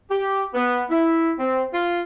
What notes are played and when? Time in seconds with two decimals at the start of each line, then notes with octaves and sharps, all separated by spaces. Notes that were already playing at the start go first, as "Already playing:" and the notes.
0.11 G4
0.54 B3
0.90 E4
1.39 C4
1.74 F4